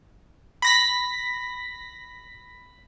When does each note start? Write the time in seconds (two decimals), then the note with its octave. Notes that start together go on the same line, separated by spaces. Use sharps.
0.62 B5 A#6 B6